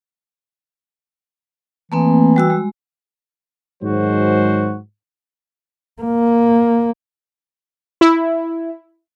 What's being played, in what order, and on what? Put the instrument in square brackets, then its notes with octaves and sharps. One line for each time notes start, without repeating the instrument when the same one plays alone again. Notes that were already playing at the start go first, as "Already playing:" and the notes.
[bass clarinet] E3 [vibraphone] A3 A#3 C4
[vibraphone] G3 F#4 E6
G#3
[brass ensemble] G#2 D#3 F#3 G#3 F#4 C5
[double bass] A#3
[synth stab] E4